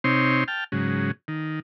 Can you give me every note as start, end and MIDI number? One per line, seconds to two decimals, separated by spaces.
0.04 0.44 48
0.04 0.44 60
0.04 0.44 63
0.04 0.44 73
0.04 0.44 84
0.48 0.64 79
0.48 0.64 81
0.48 0.64 89
0.72 1.11 44
0.72 1.11 49
0.72 1.11 54
1.28 1.60 51